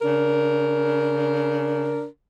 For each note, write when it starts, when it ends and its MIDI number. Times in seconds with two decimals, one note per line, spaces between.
0.02 2.05 49
0.02 2.05 62
0.02 2.05 70